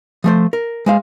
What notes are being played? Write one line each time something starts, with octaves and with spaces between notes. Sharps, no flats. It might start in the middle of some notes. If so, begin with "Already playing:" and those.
F3 A3 C5
A#4
G#3 C5 F5